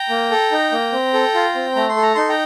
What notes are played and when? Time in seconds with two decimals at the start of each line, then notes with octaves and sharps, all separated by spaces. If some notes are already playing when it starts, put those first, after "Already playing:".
Already playing: G5 A#5
0.09 A#3
0.31 A4
0.52 D#4
0.72 A#3
0.92 C4
1.14 A4
1.34 F4
1.55 C4
1.76 A3 A#5
1.89 C6
1.96 A4
2.02 A#5
2.15 D#4 C6
2.29 G5 A#5